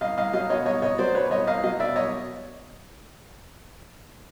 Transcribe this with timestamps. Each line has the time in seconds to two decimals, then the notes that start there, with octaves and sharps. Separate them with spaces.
0.01 C2 D#5 F5
0.18 C2 D#5 F5
0.33 F#3 D#5 F5
0.50 B2 C#5 D#5
0.66 C2 C#5 D#5
0.82 C2 C#5 D#5
0.98 F#3 C5 D5
1.15 B2 B4 C#5
1.31 C2 C#5 D#5
1.47 C2 D#5 F5
1.63 F#3 D#5 F5
1.80 B2 D5 E5
1.96 C2 C#5 D#5